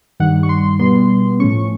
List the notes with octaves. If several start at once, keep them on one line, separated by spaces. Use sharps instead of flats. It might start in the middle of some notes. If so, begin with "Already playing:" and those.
G2 D#3 G3 F#5
C#6
C6
B2 G3 B3 C6
A2 F3 A3 C#4 C#6